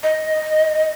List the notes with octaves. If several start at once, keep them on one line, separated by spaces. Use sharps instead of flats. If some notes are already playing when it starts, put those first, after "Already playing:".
D#5